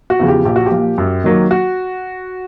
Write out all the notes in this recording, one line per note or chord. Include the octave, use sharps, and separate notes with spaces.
F#4
E2 C#3 F3
G4
A#1 G4
F#4
G4
A#2 F3
F#2
D#3 F#3 A#3
F#4